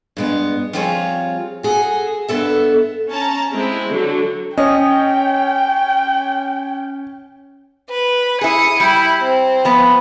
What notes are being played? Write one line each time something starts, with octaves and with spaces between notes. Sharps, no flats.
G2 G#3 B3
F3 G3 C4 F4 G#4 C#5
F#4 G#4 A4
G2 B3 A4 E5
C#4 A5 A#5
G#3 C4 E4
D3 F#3
C#4 C#5 D#5 G5
B4
E4 G#4 D#6 C#7
G3 E4
C4
F3 B3